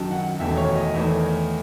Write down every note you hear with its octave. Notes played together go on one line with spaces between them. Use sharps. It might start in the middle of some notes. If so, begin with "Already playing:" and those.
Already playing: F#2 D#3 F#3 A5
F#5
E1 E2 D#3 A3 E5
C#5
D#5
E2 D#3 A3 E5